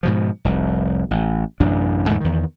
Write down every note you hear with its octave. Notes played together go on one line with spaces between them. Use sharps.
G#2 B2 F3
F1 C2
A1
A1 F#2 C3 D4
E2 G#2 D3 A3
E2 D#3